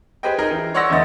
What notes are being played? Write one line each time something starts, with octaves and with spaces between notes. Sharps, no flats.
G4 G#4 B4 C5 D#5 G5
D#4 G#4 A#4
E3
C#5 D5 F#5 C6 E6 A#6
E2 D3 A3 B3 D#5 A6